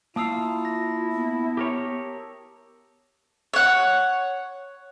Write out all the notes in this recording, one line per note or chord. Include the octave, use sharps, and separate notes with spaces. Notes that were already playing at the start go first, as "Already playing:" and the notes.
A#3 E4 F4 F5 A5 D#6 E6
A#6
B3
G4 A#4 C#5
C#5 F#5